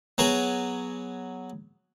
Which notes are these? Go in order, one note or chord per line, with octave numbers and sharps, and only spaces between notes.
F#3 B3 G#4